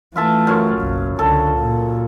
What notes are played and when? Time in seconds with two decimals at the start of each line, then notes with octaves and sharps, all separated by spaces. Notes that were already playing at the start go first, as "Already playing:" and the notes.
0.16 E3 A3 F4 E5 A5
0.47 F#2 F4 C#5
0.78 F#1 B1
1.19 C#2 D3 A4
1.59 A#2